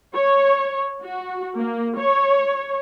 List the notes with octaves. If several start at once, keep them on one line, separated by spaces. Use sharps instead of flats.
C#5
F#4
A#3
C#5